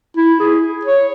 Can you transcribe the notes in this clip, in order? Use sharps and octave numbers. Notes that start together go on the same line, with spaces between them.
E4
G#4
C#5